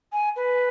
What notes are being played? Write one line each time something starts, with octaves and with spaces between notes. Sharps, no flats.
G#5
B4